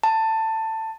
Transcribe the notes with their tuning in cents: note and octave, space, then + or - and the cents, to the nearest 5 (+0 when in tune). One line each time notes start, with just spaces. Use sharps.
A5 +15